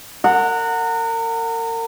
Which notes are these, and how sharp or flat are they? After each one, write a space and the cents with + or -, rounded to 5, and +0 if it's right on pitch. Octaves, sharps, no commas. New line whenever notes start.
A#4 -35 F#5 -10